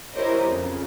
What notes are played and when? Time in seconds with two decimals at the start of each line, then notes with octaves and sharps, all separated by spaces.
0.14 E4 G4 A#4 C5 C#5 D#5
0.46 F2 C#3